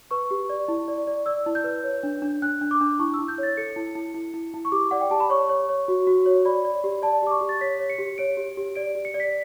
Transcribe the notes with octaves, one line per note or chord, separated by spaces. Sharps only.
B4 C#6
G4
D5
E4
D5
D5
D5 E6
E4
G6
B4
C#5
D4
D4
D4 F#6
D4
D6
D4
E4 C#6
E6
E4
G6
C#5 A6
A4 C#7
E4
E4
E4
E4
E4
C#6
G4 D6
D5 F#5
G5
G4 A5
B5
C#5 C#6
C#5
C#5
F#4
F#4
C#5
D5 B5
D5
G4
D5 A5
G4 D6
C#6
G4
A6
C#5 B6
C#5
C#7
G4
C#5 D7
G4
G4
D5 D7
G4
C#7
D5
B6